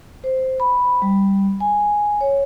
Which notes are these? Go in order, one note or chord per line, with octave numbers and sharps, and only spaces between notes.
C5
B5
G3
G#5
C#5